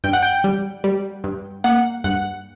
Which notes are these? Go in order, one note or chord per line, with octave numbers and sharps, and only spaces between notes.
G2 G5
F#5
G5
G3
G3
G2
A#3 F#5
G2 F#5